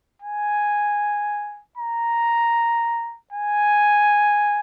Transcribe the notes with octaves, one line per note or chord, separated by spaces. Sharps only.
G#5
A#5
G#5